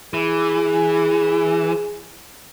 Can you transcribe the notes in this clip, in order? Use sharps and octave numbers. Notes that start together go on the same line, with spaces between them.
E3 G#4